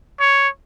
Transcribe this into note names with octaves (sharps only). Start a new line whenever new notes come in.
C#5